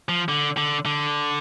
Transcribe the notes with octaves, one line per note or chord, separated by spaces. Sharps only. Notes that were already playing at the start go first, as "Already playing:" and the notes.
F3
D3
D3
D3